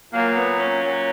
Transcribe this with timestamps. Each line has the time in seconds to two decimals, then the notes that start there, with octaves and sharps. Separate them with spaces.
0.12 A#2 F#3 A#3
0.36 B3
0.59 C#4
0.83 A#2 F#3